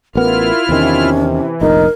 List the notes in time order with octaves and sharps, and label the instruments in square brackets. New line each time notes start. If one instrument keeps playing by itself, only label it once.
[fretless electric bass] A1 B3 [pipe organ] E4 F4 F6 [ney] A#4
[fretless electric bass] E2 D#3 [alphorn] C3 [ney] C#4
[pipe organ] E3
[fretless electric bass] F1 A#1 [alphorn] D#4 [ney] A#4